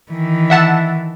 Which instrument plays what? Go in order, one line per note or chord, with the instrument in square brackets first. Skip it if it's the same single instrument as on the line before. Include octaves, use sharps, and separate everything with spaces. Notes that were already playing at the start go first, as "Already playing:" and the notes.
[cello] D#3 E3
[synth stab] E5 F#5 A5